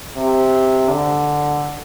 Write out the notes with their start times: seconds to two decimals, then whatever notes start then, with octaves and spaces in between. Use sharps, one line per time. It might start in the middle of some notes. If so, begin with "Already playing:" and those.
0.17 C3
0.90 D3